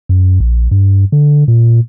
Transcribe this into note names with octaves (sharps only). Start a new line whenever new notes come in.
F#2
A#1
G2
D3
A#2